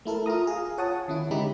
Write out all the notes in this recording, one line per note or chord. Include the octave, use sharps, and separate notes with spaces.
A3 E4 A4 A#4
F4 F5 A#5 D#6
G#4 F5
F4 C#5 F#5 G#5 A5 D#6
D#3 C#4 E4
D3 G#3 D#4 G4 B5